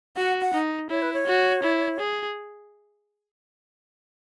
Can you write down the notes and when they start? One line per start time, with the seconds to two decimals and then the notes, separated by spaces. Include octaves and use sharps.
0.16 F#4 F#5
0.41 F#5
0.54 D#4
0.90 E4 C#5
1.02 B4
1.13 C#5
1.27 F#4
1.63 E4
2.00 G#4